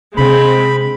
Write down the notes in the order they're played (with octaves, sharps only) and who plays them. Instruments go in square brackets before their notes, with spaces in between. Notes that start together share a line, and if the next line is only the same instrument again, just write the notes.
[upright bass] C3 D4 [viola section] G#3 C4 [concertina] B5